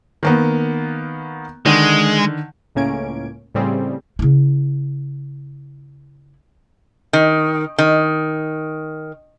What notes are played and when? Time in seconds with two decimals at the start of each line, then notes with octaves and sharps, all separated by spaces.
0.23 D#3 A#3 B3
1.66 D3 D#3 G#3
2.75 C#2 A2 A#3 C#4 G#6 D7
3.55 A2 C#3 G3 C4 G#4
4.19 C#3 E4
7.13 D#3
7.78 D#3